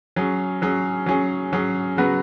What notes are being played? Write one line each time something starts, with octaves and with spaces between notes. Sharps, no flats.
F#3 C#4 G#4
F#3 C#4 G#4
F#3 C#4 G#4
F#3 C#4 G#4
C#3 F#3 B3 F#4